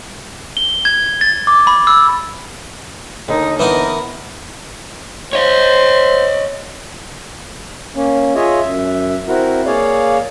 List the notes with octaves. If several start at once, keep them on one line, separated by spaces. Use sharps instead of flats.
G7
G#6
A6
D6
B5
E6
D#2 D3 D#4
E3 B3 D#4 A#4 B4
C5 C#5 D#5
A#3 C#4
F4 G#4 C#5 D#5 E5
F#2 E5
C4 E4 F#4 A#4
A#3 G#4 C#5 D5 F5